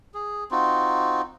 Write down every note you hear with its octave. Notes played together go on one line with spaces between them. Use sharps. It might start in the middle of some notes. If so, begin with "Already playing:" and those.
G#4
C4 D#4 F4 F#4